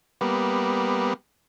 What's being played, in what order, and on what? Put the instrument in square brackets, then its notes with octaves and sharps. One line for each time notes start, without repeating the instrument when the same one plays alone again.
[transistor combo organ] G3 A#3 B3